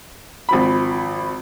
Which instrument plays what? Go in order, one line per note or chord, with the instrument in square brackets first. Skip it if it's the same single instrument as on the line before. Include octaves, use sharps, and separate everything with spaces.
[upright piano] G#1 F3 B5